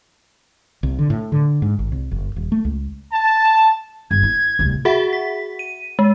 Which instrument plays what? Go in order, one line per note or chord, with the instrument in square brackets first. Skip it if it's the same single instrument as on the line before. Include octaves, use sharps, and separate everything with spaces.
[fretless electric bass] C2
D3
A2
D3
G#2
G#1
C2
F#1
D#1
A3
C#2
[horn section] A5
[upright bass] G1 [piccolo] G#6
[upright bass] E4
D1 C2
[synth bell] F#4 G#4 E5 F#5
B6
D#7
G#3